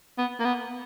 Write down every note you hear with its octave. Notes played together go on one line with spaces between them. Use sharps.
B3
A#3
B3